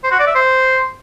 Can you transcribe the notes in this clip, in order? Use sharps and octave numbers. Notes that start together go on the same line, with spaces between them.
C5
F#4
D5
E5
C5